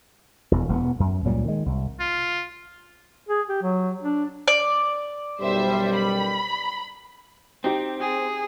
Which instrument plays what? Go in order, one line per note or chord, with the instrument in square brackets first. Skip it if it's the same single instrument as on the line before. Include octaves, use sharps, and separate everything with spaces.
[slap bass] E1 E2
E1 A#3 B3
F#2
C#2 A#2 F#3 G3
D#3 G#3
C2
[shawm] F4
[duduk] G#4
G4
F#3
D4
[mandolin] D5
[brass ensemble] B1 F#2 G3 [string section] C5 E5
[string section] B5
[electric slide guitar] C4 [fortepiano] D#4 G4
[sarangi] G#4